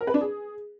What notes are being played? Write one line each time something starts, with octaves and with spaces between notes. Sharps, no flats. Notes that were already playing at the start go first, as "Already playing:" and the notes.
A#4
B4
D4
G#4